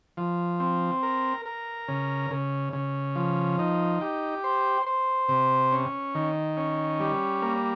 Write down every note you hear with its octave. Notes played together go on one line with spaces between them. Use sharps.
F3
C4
A#4
A#4
C#3
C#3
C#3
F3
D#4
G4
C5
C5
C3
C#4
D#3
C#4
G3
A#3